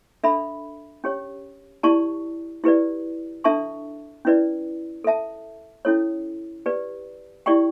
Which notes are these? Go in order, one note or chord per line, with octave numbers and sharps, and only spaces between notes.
D4 A4 E5 B5
C#4 G4 C#5
E4 G4 D5 A5 C#6
E4 G4 B4 D5
D4 A4 E5 A5 C#6
C#4 E4 B4 D5
A4 E5 A5
C#4 E4 A4 C#5
G4 B4 D5
E4 G4 D5 G5 C#6